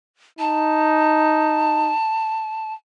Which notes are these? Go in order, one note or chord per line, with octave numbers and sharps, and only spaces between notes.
D#4 A5